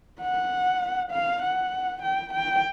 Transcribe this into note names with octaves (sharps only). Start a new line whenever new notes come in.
F#5
F5
F#5
G5
G5